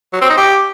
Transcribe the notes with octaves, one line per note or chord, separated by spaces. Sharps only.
F#3
C4
D#4
G4